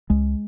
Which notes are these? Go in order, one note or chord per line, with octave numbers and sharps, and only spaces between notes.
C#2 G#3